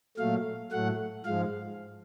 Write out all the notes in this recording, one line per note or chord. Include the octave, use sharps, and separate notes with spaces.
A#2 F#3 A3 F5
A2 F#3 A3 F#5
G#2 F3 G#3 F5